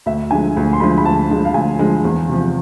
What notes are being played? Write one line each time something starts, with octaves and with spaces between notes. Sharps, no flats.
D2 E5
D3 F3 G#3 G#5
D2
C6
D3 F3 G#3 B5
B5
D2 A5
D3 F3 G#3
F5
D2 G#5
D3 F3 G#3
E2
C3 F3